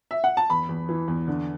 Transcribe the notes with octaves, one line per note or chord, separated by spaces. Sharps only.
E5
F#5
A5
E2 B5
E2
E3
E2
D3